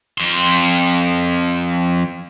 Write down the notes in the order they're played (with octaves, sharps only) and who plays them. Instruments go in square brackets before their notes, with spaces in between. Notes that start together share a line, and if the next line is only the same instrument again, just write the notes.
[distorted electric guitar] F2 C6